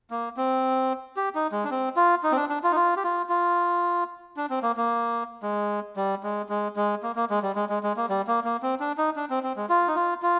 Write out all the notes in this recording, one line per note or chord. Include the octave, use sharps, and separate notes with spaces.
A#3
C4
G4
D#4
G#3
D4
C4
F4
D#4
C4
D4
D4
F4
D#4
F4
G4
F4
F4
D4
C4
A#3
A#3
G#3
G3
G#3
G#3
G#3
A#3
A#3
G#3
G3
G#3
G#3
G#3
A#3
G3
A#3
A#3
C4
D4
D#4
D4
C4
C4
G#3
F4
D#4
F4
F4